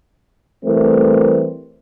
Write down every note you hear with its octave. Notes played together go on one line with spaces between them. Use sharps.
E3 G3 A3 C4 A#4